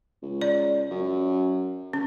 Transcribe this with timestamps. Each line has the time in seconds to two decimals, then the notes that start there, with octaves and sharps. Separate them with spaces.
0.23 C#2
0.41 D5
0.91 F#2
1.93 C#4